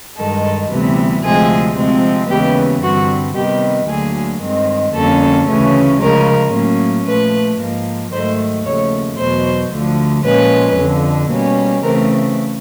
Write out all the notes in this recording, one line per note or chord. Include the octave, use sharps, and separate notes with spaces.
G2 D#3 G#3 A4
D2 C3 E3 G3 B3
D2 C3 F3 G#3 C4 G#4
C3 F3 G#3 C4
D#2 C#3 E3 G#3 B3 G4
G2 D3 G3 C4 F#4
C3 D#3 G3 B3 G4
D2 D3 F#3 A#3 G#4
G2 D#3 G#3 C4
F2 D3 G3 A#3 C#4 A4
D2 C#3 E3 A3 C#4
C#3 F3 G#3 C#4 A#4
A2 F#3 A#3 C#4
A#2 F3 A3 B4
G#2 F3 A#3
G#2 D#3 F#3 A3 C5
D#2 C#3 F3 A3 C#5
E2 B2 F#3 C5
D2 D3 F3
A#2 F3 G#3 C#4 B4
F2 D3 F3
B2 G3 A#3 C#4
C#3 E3 A3 C4 A#4